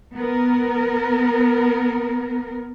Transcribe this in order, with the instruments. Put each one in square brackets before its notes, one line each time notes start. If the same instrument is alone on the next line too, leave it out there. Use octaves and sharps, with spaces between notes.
[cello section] B3 A#4